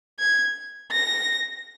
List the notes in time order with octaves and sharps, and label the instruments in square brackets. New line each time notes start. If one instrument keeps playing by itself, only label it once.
[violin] G#6
A#6